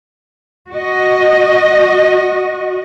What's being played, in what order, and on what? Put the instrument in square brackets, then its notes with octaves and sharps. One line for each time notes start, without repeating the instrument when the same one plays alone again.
[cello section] F#4 D#5